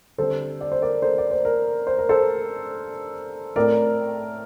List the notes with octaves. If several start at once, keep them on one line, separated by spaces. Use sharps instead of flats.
D3 G3 C4 A4 C5
D5
C5
A#4 D5
A4 C5
D5
C5
A#4
C5
A#4
A4 C5
A2 A3 C4 A#4 D5